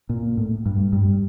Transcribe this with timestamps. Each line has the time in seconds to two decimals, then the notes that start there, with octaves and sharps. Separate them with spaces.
0.09 A#2
0.37 A2
0.66 G2
0.93 G2